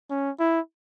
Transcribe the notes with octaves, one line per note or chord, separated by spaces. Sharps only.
C#4
E4